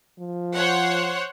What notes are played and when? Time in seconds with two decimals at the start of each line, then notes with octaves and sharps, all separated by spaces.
0.19 F3
0.55 C5 C#5 F#5